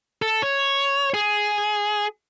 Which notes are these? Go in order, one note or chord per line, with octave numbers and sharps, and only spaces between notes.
A4
C#5
G#4